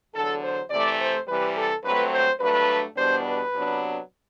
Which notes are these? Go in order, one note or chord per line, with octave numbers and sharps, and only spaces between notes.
E2 D3 F#3 A4
C5
C3 E3 A3 D5
C5
C3 E3 G3 B4
A4
G2 F#3 A3 C4 B4
C5
G2 F#3 A3 D4 B4
E2 B2 G3 B3 D4 C5
B4
C3 F#3 B3 D4